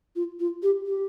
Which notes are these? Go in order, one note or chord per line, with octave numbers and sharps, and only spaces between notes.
F4
F4
G4
G4